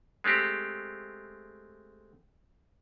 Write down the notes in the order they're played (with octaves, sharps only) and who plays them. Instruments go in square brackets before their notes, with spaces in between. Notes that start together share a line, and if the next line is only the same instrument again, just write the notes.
[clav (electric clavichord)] G#3 A3 C4 G4